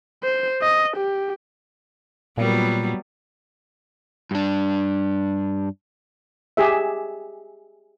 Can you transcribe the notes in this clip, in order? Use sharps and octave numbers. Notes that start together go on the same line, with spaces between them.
C5
D#5
G4
A#2 F#3 G3 B3
G2 D4
G4 G#4 E5